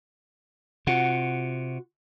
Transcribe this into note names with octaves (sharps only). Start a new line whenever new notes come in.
C3 F4 F#4 F#5